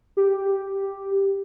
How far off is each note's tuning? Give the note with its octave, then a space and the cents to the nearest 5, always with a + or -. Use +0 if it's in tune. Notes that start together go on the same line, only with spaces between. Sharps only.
G4 +0